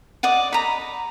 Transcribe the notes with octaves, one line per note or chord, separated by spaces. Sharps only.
D5 D#5 F#5
A#5 B5